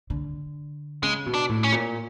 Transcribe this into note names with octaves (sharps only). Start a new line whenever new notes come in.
D3
C#3 G#3
B2
D4
A2
C#4
A#2